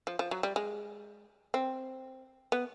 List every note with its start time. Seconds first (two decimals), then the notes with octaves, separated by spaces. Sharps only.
0.07 F3
0.19 F3
0.31 F#3
0.43 G3
0.56 G#3
1.54 C4
2.52 B3